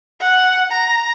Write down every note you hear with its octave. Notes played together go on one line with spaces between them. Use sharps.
F#5
A#5